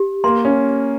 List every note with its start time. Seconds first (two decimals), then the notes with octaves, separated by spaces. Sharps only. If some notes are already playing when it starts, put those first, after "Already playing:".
Already playing: G4
0.24 A#3 C6
0.45 C#4